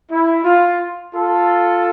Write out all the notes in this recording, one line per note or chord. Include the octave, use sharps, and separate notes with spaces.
E4
F4
F4 A4